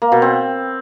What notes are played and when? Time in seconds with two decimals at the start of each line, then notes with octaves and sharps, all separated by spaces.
0.02 A#3
0.12 B2
0.22 C4